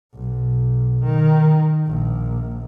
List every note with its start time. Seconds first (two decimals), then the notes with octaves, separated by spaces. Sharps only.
0.14 B1
1.03 D#3
1.87 A#1